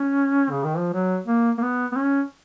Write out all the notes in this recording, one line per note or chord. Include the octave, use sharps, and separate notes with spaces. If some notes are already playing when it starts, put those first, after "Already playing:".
Already playing: C#4
C#3
D#3
F3
F#3
A#3
A#3
B3
B3
C#4